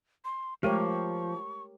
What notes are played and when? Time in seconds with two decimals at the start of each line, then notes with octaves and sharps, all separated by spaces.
0.25 C6
0.63 F3 G#3 A3 G4 A#4 C#5 C#6